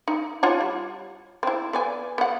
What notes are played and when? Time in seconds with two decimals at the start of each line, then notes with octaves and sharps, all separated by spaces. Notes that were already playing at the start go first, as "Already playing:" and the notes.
0.08 D#4
0.43 F4 C#5 F#5
0.61 G3
1.43 C4 E4
1.73 B3 D5 G#5
2.18 B3 F#5